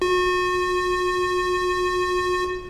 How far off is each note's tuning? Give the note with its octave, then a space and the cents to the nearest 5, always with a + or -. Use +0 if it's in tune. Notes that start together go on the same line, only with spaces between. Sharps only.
F#4 -35